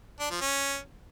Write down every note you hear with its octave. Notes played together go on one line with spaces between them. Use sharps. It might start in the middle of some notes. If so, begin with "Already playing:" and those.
D4
F3
C#4